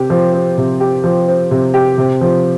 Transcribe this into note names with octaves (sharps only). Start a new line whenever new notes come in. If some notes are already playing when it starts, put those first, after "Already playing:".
Already playing: C3 G4
F3
C4
C3
G4
F3
C4
C3
G4
C3
F3